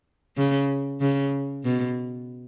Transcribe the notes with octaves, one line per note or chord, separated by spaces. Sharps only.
C#3
C#3
B2